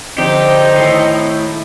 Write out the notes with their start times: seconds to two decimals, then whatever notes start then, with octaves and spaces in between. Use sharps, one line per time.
0.18 F2 D3 F3 C4 D#4 G4 A4
0.76 A2 D#3 G#4 D#5 G#5